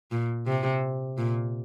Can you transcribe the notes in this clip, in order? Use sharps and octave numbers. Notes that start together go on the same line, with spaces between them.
A#2
C3
A#2